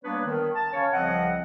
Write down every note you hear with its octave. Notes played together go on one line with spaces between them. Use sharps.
G3 A#3 B3 D4 B4 C#5
D#3
A5
C#3 C#4 C#5
C2 C#3 F3 C4 D#5 F#5